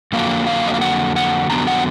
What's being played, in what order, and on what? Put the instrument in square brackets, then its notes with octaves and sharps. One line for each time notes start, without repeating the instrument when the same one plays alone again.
[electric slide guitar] F2 D3 F#3 A#3 F5
F5
D#5
F5
F#5
F#5
F2 D3 F#3 B3 A#5
F#5